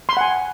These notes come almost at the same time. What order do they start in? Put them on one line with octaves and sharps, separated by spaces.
C6 B5 F#5 G#5